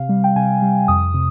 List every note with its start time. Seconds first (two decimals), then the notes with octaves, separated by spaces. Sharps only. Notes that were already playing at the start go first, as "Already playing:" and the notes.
Already playing: C3 F5
0.09 G3
0.24 G5
0.35 C3 G#5
0.62 G3
0.88 F2 D#6
1.14 C3